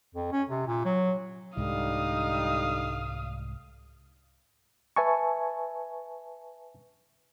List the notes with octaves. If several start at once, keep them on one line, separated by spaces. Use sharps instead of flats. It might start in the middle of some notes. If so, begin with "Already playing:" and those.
F2
C#4
C3
A#2
F#3
C2 G#2 D3 G3 G#3 D#4 F5 D#6
B4 E5 G#5 A5 C#6